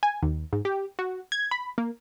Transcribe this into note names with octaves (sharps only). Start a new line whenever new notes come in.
G#5
D#2
G#2
G4
F#4
G#6
B5
A#3